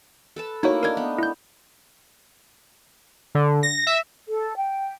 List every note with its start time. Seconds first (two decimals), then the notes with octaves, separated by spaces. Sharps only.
0.36 A4 B4 A5
0.63 A3 A#3 D#4 E4 F#4 C#5
0.83 D4 D#4 A#4 G#6
0.97 B3
1.18 E4 G6
3.35 D3
3.63 A#6
3.87 E5
4.28 A4
4.57 G5